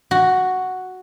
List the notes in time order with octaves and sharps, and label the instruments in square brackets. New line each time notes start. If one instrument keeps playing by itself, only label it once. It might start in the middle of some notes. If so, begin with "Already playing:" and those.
[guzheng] F#4